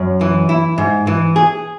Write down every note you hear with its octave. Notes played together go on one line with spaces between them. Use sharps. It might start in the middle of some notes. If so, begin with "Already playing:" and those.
Already playing: F#2
E3
E4
G#2
E3
G#4